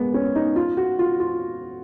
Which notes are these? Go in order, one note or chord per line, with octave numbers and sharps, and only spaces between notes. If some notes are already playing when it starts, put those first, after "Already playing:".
Already playing: G#3 A#3 B3
C#4
D#4
F4
F#4
F4
F4